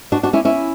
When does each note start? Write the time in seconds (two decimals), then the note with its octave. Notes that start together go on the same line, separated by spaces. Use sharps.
0.12 D4 F#4
0.23 D4 F#4
0.33 C#4 E4
0.45 C#4 E4